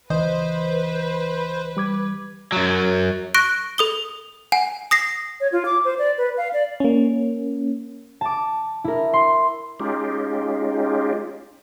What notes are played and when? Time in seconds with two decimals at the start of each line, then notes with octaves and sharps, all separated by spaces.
0.10 C#2 E3 B4 C5 D#5
1.77 G3 D6 G#6
2.52 F#2 F#3
3.34 C#6 F#6 A#6 D7
3.78 A4 D#6 G7
4.52 F#5 G#5
4.91 D#6 A#6 C7
5.40 C#5
5.52 F4
5.66 D6
5.85 C5
5.99 D5
6.18 B4
6.37 F5
6.53 D5
6.80 A#3 C#4
8.21 A5 D6
8.84 E4 A#4
9.13 C6
9.80 G#3 C#4 D#4 F4 G4